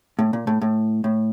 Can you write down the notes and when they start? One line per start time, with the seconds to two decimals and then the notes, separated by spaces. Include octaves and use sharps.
0.19 A2
0.33 A#2
0.47 A2
0.62 A2
1.04 A2